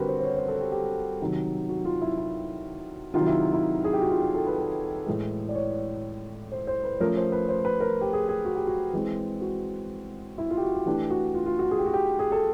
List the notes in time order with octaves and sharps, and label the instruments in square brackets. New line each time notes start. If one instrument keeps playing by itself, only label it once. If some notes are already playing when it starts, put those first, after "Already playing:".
Already playing: [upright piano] D3 G3 C4 F#4 G4 A#4 B4
C5
C5
C#5
C5
A4
G4
G4
C3 D#3 F#3
F#4
F4
E4
E4
C3 D#3 F#3 F4
E4
E4
G#4
G4
F#4
F4
F#4
A4
B4
B4
A2 E3 G#3
D5
C#5
C5
C5
B4
F3 A3 C#4 A#4
C5
B4
C5
B4
A#4
G4
G#4
G#4
F#4
G4
F#4
E3 G#3 C4
F#4
E4
F4
G4
F#4
G4
E3 A3 D4 G4
F#4
F4
F4
F#4
G#4
G4
F#4
G4
G#4
A4